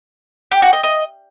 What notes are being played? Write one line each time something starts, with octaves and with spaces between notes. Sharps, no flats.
G4
F#4
D#5
D#5